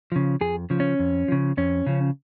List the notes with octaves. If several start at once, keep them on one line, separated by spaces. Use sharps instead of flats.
C#3 F3
F2 G#4
C#3 F3
C#4
F2
C#3 F3
F2 C#4
C#3 F3